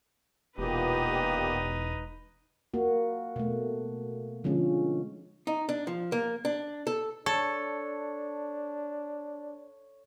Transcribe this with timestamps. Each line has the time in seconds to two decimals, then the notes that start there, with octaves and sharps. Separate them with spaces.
0.58 E1 A#2 B3 D#4 G4 B4
2.74 A#3 F#4
3.36 B2 A3
4.44 D3 F3 G#3 C#4
5.47 D#4
5.69 D4
5.87 F3
6.12 A#3
6.45 D4
6.87 A4
7.26 D4 A4 C#5